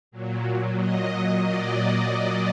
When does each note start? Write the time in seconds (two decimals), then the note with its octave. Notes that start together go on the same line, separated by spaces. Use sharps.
0.11 A#2 F#3
0.78 D#5
1.44 D5